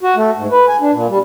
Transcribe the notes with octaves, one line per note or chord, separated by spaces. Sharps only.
F#4
A3
G#2
B4
G#5
D4
A#2
G3